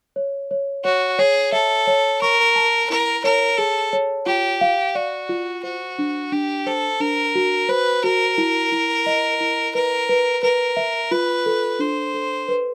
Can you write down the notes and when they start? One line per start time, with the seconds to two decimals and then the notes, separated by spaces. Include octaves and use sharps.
0.16 C#5
0.51 C#5
0.85 F#4 C#5
1.19 G#4 C#5
1.52 A4 E5
1.87 C#5
2.21 A#4 C#6
2.56 A5
2.89 E4 A#4
3.24 A#4 C#5
3.58 G#4 A4
3.93 C#5
4.26 F4 G4
4.61 F5
4.95 F#4 D5
5.29 F4
5.63 F#4 C5
5.99 D4
6.32 D4 G4
6.66 A4 C5
7.00 D4 A#4
7.35 F#4
7.69 B4 C5
8.03 F#4 A#4
8.38 E4
8.72 E4
9.06 D#5
9.40 E4
9.75 A#4 B4
10.09 B4
10.43 A#4 B4
10.77 E5
11.11 F4 B4
11.46 A4
11.79 D4 C5
12.14 A4
12.48 B4